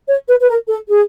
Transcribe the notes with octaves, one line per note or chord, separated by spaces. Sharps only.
C#5
B4
B4
A#4
A4
G#4